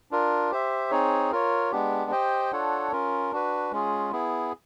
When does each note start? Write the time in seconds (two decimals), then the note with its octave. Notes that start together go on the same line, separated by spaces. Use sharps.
0.11 D4 F4 A#4
0.51 G4 C5 E5
0.91 C4 D#4 G#4 C#5
1.32 F4 A#4 C#5
1.71 G#3 B3 D4 G4
2.11 G4 C5 D#5 G5
2.52 D4 F4 A4 C#5 F#5
2.92 C#4 F4 A#4
3.32 D4 F#4 B4
3.71 G#3 C#4 F4 G#4
4.12 B3 E4 G#4